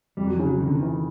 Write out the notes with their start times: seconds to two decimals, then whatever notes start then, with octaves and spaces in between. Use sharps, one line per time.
0.17 F2 G3
0.27 F#3
0.37 C#3 F3
0.46 F#3
0.61 F2 D#3
0.68 D3
0.75 D#3
0.83 E3